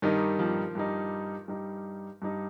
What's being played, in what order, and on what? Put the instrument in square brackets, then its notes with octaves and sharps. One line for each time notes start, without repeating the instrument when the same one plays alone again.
[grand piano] G2 G3 D#4 [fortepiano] D#3
[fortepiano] F3
[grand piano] G2 G3 D#4
G2 G3 D#4
G2 G3 D#4